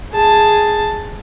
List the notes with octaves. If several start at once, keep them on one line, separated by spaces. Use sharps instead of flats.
G#4 A5